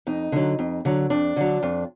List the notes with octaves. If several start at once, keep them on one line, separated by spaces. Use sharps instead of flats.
F2 D#4
D3 F#3
F2
D3 F#3
F2 D4
D3 F#3
F2